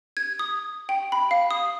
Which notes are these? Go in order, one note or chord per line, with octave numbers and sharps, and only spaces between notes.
G#6
D#6
G5
B5
F5
D#6